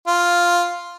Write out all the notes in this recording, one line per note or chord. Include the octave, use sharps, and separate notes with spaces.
F4